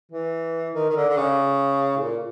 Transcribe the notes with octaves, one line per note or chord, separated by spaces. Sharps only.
E3
D#3
D#3
D3
D3
C#3
A2
A#2